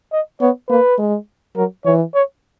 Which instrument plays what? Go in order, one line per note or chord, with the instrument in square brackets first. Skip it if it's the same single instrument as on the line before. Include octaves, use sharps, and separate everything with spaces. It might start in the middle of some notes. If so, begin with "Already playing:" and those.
[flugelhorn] D#5
[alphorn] B3 [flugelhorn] C#5
[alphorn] A#3 [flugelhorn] B4
[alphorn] G#3
[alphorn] F#3 [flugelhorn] A#4
[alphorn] E3 [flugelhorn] C#5
[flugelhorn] C#5